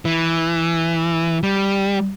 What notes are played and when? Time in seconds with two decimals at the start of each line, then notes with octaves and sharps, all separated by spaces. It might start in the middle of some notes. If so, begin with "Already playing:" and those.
0.05 E3
1.43 G3